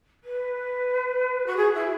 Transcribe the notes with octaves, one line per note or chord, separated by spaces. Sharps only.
B4
F#4
G#4
E4